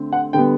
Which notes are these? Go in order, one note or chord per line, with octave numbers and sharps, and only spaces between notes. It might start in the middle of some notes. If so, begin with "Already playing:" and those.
Already playing: D3 A3 C4
F#5
D3 G3 B3 G5